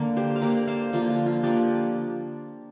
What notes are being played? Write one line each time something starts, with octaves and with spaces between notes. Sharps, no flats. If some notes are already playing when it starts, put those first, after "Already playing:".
Already playing: D3 A#3
G4 C5
F5
D3 A#3 A#4 D5
C5 F5
D3 F3 A#3 F4
F4
F4
D3 F3 A#3 D4 G4